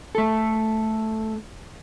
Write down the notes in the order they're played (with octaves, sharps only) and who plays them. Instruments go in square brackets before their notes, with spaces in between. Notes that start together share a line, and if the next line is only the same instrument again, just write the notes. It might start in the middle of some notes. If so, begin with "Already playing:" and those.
[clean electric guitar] A3 A4